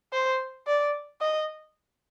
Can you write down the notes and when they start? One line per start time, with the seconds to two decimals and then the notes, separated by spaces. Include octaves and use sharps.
0.13 C5
0.67 D5
1.21 D#5